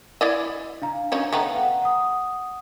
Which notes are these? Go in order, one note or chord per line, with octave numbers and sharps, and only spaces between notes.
E4 D5 D#5
D4 F5 A#5
F#3 C#4 D#4
A3 B3 D#4 F5 G5 A#5
F#5
F#5 D#6